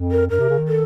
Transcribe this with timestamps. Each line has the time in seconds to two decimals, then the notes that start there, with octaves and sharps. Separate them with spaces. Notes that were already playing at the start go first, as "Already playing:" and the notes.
Already playing: F2
0.11 A#4
0.30 F#2 A#4
0.39 C3
0.49 C#3
0.58 D#3
0.68 A4